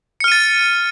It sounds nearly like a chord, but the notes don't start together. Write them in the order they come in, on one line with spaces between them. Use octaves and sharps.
C#7 F6 D#7 A6